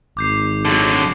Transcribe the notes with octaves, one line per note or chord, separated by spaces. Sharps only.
G#1 D6 G6 C7
D3 F#3